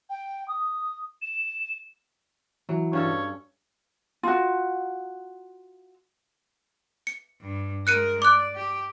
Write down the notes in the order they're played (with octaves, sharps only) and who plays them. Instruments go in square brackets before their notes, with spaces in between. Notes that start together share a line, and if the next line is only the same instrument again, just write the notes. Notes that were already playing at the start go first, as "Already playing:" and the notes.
[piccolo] G5
D#6
E7
[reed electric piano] E3 E4 F#4 [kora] F#3
[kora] G2 C#4 A4 [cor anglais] C#5
[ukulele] F4 F#4
[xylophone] C#7
[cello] G2
[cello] G#3 A#4 [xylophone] F#6 C#7 D#7
[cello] D5 [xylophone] D6 F#6
[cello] G4